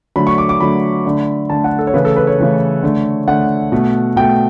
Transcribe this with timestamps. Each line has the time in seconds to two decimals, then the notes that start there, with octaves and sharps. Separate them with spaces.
0.16 D3 F#3 A3 B5
0.27 C#6
0.38 D6
0.49 D6
0.60 D3 F#3 A3 B5
1.05 D3 A3
1.50 D3 A3 A5
1.64 F#5
1.79 A4
1.87 C#5
1.94 C#3 E3 A3 B4
2.05 A4
2.16 B4
2.27 C#5
2.38 C#3 E3 A3
2.83 D3 A3
3.27 D3 A3 F#5
3.72 B2 A3
4.16 B2 A3 G5